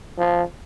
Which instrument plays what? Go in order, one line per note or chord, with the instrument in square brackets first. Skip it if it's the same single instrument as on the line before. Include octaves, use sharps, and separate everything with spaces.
[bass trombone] F3